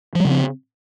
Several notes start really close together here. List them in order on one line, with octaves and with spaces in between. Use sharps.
F3 G3 C#3 C4